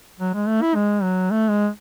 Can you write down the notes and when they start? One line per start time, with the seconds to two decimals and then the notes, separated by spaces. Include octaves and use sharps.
0.20 F#3
0.34 G#3
0.48 A3
0.62 E4
0.75 G#3
1.02 F#3
1.31 A3
1.49 G#3